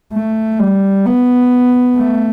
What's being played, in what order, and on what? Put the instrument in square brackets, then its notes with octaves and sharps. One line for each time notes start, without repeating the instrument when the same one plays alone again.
[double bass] A3
G3
B3
A3